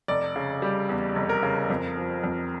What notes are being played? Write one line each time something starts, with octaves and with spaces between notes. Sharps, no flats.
F1 D5
C#3
G3
E2
F1
A#4
C#3
F2
F3
F2